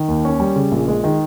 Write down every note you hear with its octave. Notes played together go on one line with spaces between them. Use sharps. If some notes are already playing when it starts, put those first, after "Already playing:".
Already playing: D#3
D#2
C#4
G3
C#3
A#1
G#3
D#3